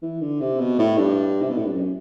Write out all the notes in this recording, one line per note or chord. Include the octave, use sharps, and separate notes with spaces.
E3
D3
C3
B2
A2
G2
C3
B2
A2
G2
F#2